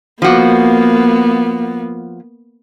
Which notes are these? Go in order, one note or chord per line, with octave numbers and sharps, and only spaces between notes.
F3 A#3 B3 F#4